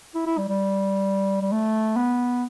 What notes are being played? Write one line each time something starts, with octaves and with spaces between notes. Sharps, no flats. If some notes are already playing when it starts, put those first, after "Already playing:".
E4
E4
G3
G3
G3
A3
B3